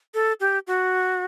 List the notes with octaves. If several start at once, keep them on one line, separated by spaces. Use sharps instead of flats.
A4
G4
F#4